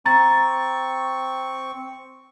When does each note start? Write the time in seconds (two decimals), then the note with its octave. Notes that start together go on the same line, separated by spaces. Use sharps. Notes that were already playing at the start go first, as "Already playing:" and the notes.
0.06 C4 A#5 C#6 A6